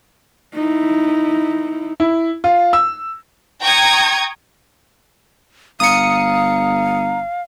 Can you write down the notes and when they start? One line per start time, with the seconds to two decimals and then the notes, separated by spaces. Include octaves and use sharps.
0.55 D#4 E4
2.00 E4
2.44 F4
2.73 E6
3.62 G5 A#5 C#6 D#6 G#6
5.80 G1 F5 A#5 D#6 C#7